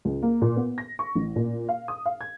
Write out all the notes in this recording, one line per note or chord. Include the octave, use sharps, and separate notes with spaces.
C#2
A#3
A#2
B3
A#6
C#6
A1
A#2
F5
D#6
F5
G#6